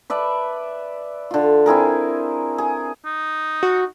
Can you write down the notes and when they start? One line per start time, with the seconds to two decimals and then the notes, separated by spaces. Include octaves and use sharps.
0.10 B4 D5 E5 A5
1.31 D3 F4
1.66 C4 E4 G#4 A#4
2.58 G#4
3.05 D#4
3.63 F#4